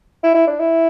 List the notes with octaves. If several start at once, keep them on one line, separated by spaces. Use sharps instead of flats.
E4
E4
D4
E4